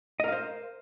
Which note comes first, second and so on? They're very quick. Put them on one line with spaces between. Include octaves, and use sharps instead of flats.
D#5 A#4 F5 C5